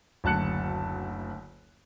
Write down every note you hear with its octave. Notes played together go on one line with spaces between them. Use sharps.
F#1 D2 A5 F#6 C#7